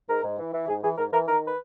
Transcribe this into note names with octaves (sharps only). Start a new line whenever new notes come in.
G#2 A#4
G#2
E3
E3
G#2 G#4
E3 G#4
G#2 A#4
E3 A#4
D#3 A#4
B4